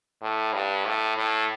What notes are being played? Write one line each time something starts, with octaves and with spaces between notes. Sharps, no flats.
A2
G2
A2
A2